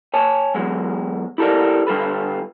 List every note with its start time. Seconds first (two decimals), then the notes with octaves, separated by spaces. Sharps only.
0.14 C#5 G#5 A5
0.55 E2 F#3 G#3
1.38 E4 G4 A4 A#4 D5
1.87 D3 G3 F4 A4 B4